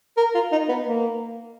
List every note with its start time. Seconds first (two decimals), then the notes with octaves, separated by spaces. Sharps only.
0.17 A#4
0.35 F4
0.52 D#4
0.68 B3
0.86 A#3